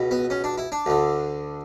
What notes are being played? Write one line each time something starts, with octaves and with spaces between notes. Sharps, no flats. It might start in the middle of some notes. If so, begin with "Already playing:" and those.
Already playing: C#2 B2
B3
C#4
D4
E4
D4
D2 D3